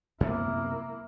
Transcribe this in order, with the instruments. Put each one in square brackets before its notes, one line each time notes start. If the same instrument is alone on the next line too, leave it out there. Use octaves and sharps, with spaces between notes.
[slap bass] F#2 C3 B3 [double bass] A#3 E4